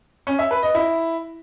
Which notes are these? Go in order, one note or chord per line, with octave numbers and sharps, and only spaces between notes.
C#4
E5
B4
D#5
E4